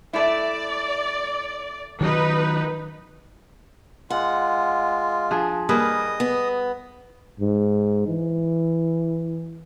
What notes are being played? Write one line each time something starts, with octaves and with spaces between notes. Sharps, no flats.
A3 E4 D5
D#3 F#3 D#4 B4
G#3 F4 F#5
F3 D4 G#4
G3 A#3 G#4 B4 D#5 D#6
B3
G#2
E3